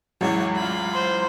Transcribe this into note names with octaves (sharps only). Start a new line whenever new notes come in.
A1 E2 E3 F#3 G#3 C#5
F4 B5
C5